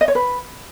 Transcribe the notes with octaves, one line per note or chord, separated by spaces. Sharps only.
D#5
C#5
B4